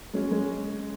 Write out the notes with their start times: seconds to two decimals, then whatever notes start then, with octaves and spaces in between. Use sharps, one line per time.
0.13 G#3 C#4
0.31 G#3 C#4